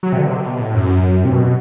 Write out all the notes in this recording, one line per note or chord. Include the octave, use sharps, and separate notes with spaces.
F#3
C3
D3
B2
C3
B2
A2
F#2
C3
B2